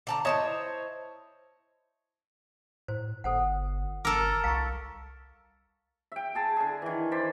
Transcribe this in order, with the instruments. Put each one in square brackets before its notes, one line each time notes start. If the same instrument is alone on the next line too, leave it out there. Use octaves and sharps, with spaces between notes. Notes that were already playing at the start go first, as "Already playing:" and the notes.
[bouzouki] D3 A5 A#5
[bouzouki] E4 C5 A5 [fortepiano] C#5 D#5
[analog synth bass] A2 [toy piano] C5
[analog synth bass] G1 [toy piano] A4 C5 F#5
[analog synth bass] G1 [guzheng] A4 A#4 [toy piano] D6
[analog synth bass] C2 [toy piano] F5 A#5 C#6
[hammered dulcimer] E5 G5
G#4 A5 B5
D3 G#4
D#3 E3
C5 D5 B5